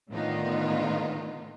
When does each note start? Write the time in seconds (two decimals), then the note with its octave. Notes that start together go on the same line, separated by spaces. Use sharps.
0.11 A2 D3 D#3 B3 D#4 F4